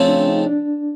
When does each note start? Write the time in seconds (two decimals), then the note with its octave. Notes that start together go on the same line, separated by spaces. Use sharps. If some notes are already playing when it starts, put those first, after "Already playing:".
Already playing: C#3 F3 A3 C4
0.09 D4
0.28 D#4
0.46 D4